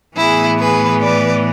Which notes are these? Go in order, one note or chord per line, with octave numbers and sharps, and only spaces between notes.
A2 E3 B3 E4 G#4
G#4 B4
B4 D5